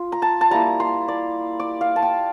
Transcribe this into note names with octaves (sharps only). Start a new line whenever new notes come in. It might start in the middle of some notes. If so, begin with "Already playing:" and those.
Already playing: F4 C6
A#5
A5
A5
G3 A#3 E4 A#5
C6
D5
D5
F5
A5
G5